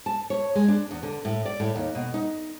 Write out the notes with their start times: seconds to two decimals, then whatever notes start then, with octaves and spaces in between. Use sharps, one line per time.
0.06 A5
0.30 C#5
0.55 G#3
0.68 D4
0.91 E2
1.03 D3
1.25 A2
1.46 D5
1.60 A2
1.76 D#2
1.95 B2
2.14 D#4